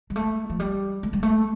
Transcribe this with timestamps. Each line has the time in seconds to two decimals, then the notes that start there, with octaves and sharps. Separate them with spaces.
0.10 G3
0.16 A3
0.50 F3
0.59 G3
1.03 A3
1.13 G3
1.23 A3